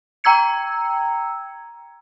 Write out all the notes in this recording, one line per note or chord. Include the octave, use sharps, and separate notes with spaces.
G5 A#5 E6 G#6 C#7